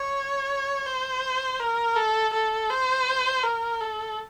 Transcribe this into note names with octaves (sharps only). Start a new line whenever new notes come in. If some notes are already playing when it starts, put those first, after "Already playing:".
Already playing: C#5
C5
A#4
A4
A4
C5
A#4
A4